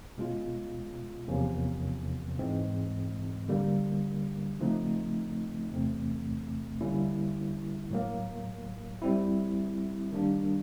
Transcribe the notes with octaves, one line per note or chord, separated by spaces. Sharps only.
B2 G#3 C#4 F4
E2 C3 F3 A#3 C#4
G#2 E3 G#3 C4
D3 G3 A#3
C#3 F3 A3 C4 D#4
E2 C3 E3 A3 C4
D3 G3 A#3 C#4 E4
A2 F#3 A#3
G3 C4 E4
D#3 G3 A#3 D4